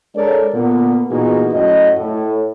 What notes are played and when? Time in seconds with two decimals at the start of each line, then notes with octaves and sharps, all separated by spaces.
0.16 G#3 D4 A4 A#4 C#5 D5
0.53 A#2 D3 A#3 B3
1.10 A#2 E3 B3 D#4 F#4 G#4
1.53 F#2 A2 F#4 D#5
1.98 A2